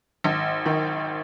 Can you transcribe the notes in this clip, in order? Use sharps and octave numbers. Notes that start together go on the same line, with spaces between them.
G#1
D#3